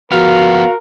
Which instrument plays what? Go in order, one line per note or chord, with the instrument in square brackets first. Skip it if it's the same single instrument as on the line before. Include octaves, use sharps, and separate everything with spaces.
[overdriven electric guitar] F3 B3 [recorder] F#4 [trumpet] A#4 [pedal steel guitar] F5